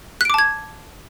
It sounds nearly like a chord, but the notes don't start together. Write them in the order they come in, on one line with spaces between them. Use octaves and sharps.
F#6 D7 D6 A5 G#6